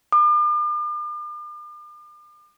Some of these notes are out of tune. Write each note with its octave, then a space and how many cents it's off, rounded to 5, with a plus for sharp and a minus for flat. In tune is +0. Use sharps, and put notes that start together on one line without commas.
D6 +45